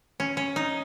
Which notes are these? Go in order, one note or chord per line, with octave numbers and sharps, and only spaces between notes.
C#4
C#4
D#4